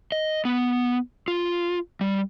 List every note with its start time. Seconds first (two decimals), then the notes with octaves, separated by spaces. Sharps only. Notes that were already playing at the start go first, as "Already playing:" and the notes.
0.12 D#5
0.45 B3
1.28 F4
2.01 G3